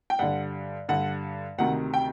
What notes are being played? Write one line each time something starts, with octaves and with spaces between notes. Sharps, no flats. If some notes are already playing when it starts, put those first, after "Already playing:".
G5
G2 D3 F#5
G2 D3 F#5
D2 C3 D#3 F#5
G5